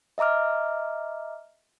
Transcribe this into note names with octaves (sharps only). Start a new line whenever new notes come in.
D#5 E5 A#5 D6 F6